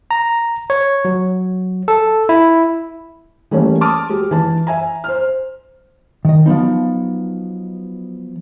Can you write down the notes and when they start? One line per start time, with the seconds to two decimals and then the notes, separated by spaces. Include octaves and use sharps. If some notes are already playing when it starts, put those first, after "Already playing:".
0.11 A#5
0.70 C#5
1.05 F#3
1.88 A4
2.29 E4
3.51 E3 G3 A3 A#3 C#4
3.81 A5 D6 D#6 F6
4.09 G#3 F#4 G4
4.31 E3 A5
4.67 E5 G#5 A#5
5.04 C5 F6
6.25 D#3 D#5
6.46 F3 F#3 B3 D#4